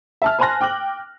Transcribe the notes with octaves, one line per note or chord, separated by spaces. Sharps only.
E5 A5 F6
C5 G#5 A5 C6 F#6 A#6
G5 D6 F#6 F#7